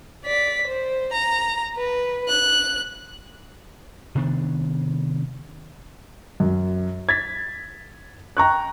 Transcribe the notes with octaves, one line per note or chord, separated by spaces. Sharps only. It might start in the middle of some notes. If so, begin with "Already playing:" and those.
D5 B6
C5
A#5
B4
F#6
C3 D#3 B3 D4
F#2
G#6 A6 B6
G5 A#5 C#6 F#6